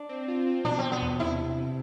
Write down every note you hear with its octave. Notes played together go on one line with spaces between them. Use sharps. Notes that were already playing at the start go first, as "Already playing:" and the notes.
Already playing: D4
C4
F4
C4
B2 D4
B2 C4
B3
E2
C3 E4